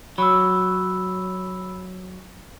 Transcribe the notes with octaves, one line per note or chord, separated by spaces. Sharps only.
F#3 B5 E6